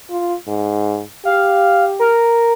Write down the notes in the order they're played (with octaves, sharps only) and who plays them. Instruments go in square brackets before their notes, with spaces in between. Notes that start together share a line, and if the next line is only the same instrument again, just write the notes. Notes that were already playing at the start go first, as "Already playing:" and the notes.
[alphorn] F4
G#2
[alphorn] G4 [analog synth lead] F5
[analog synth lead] A#4